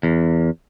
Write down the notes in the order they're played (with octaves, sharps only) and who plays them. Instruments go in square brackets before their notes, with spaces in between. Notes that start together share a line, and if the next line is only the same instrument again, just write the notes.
[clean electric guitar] E2